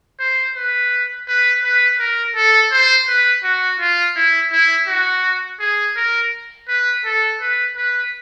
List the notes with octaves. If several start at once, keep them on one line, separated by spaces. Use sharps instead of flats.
C5
B4
B4
B4
A#4
A4
C5
B4
F#4
F4
E4
E4
F#4
G#4
A#4
B4
A4
B4
B4